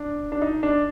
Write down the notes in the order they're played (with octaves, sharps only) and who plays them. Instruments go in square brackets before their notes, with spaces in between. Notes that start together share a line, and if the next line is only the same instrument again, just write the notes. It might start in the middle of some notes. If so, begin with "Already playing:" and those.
Already playing: [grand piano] D4
D4
D#4
D4